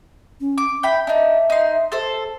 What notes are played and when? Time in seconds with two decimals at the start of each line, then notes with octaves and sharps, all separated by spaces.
0.40 C#4
0.58 D6
0.83 E5 G5 B5
1.07 D4 D#4 E5
1.50 D#4 C6
1.92 A4 C5